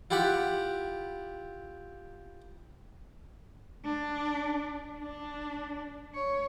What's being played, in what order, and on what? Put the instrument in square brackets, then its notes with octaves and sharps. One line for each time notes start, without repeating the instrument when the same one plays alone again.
[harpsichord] E4 F4 G4 F#5 B5
[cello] D4
D4
C#5